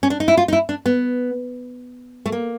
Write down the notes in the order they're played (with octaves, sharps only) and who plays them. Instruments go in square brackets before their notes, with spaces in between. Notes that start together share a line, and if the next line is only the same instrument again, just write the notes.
[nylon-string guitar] C#4
D4
D#4
E4
F4
D#4
E4
D4
B3
A3
A#3